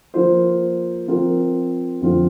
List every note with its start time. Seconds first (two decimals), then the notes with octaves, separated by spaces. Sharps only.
0.14 F3 A#3 F4 C5
1.08 F3 C4 F4 A#4
2.01 F2 D3 F3 C4 F4